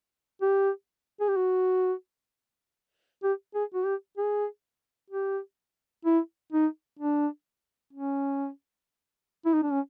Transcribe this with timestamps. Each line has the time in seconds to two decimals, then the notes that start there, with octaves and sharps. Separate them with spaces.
0.42 G4
1.21 G#4
1.29 G4
1.36 F#4
3.23 G4
3.55 G#4
3.74 F#4
3.85 G4
4.17 G#4
5.10 G4
6.05 E4
6.52 D#4
6.99 D4
7.93 C#4
9.46 E4
9.54 D#4
9.63 D4
9.72 C#4